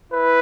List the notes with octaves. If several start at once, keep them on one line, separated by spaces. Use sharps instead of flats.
E4 B4